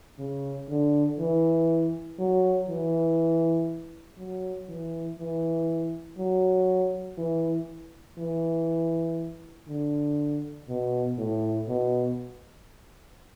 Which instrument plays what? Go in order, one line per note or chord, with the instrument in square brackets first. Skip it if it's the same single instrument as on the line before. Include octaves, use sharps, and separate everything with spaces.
[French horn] C#3
D3
E3
F#3
E3
F#3
E3
E3
F#3
E3
E3
D3
B2
A2
B2